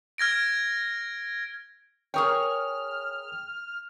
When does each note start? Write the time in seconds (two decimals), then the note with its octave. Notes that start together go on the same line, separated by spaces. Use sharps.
0.18 F6 G#6 A#6 D7
2.14 G#4 A#4 C#5 G5 D#6 F6